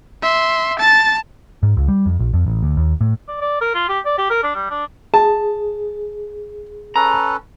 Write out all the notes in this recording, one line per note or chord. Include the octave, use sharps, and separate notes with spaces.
E5 C6
A5 A6
G#2
C#2
G3
F2
A#1
F2
A1
D2
D#2
A2
D5
D5
A#4
F4
G4
D5
G4
A#4
D4
G3
D4
G#4 A5
C#4 A4 B4 A#5